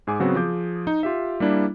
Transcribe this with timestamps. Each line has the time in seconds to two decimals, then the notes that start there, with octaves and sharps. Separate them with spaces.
0.07 G#2 G#4 G#5 D6
0.20 C#3 F#3 B3 C4 F#4 G#4
0.35 F3 G#4 D6 G6
0.87 D#4
1.03 F4 G4 E5
1.40 G3 A#3 D4 E4